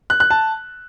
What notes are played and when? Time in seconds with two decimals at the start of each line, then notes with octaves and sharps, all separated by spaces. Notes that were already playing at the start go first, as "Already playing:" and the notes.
0.10 F#6
0.20 F#6
0.30 A5